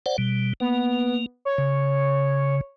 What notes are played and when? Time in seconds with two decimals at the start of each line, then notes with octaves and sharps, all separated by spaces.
0.06 C5 D5 F#5
0.18 B2 G3
0.60 A#3 B3
1.45 C#5
1.58 C#3